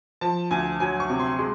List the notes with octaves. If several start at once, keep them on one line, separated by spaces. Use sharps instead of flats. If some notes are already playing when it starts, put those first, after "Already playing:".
F3 A5
D2 G#5
F#3 G#5
C#6
C3
C6
G#3 C6